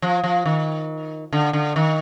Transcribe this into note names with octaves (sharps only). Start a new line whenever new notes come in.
F3
F3
D#3
D3
D3
D#3